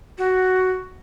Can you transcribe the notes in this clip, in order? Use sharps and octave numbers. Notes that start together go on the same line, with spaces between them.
F#4